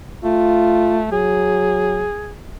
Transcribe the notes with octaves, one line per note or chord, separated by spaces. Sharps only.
A3 F4
F#3 G#4